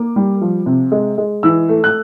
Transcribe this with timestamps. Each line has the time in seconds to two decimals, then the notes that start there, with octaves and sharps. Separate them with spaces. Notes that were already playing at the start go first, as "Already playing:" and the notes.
Already playing: A#3 D6
0.16 G3
0.41 F3
0.66 C3
0.92 G#3
1.18 G#3
1.43 E3 E6
1.69 A3
1.84 F#6